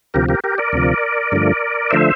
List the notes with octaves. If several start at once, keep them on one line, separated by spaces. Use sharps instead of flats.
D2 C3 F3 G4 A#4
G4 A#4
G4 A#4
A#4 D5
D2 C3 F3
G2 D3 F3 A3
D3 F3 A3 C5 E5